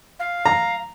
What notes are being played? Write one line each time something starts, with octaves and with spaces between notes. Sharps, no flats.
F5
A#5